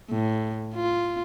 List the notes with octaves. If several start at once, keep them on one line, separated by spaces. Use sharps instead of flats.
A2
F4